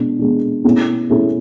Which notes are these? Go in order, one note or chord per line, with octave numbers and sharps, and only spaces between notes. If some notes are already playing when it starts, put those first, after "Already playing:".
Already playing: B2 G#3 D4
B2 G#3 D4
B2 A3 C#4 E4 G#4
B2 A3 C#4 E4 G#4